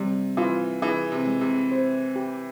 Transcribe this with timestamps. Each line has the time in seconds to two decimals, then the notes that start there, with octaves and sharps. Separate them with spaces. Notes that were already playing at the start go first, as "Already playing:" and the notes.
Already playing: C3 G3
0.37 E3 F4
0.82 E3 G#4
1.12 C3
1.27 G#3
1.41 C3
1.72 C5
2.16 G4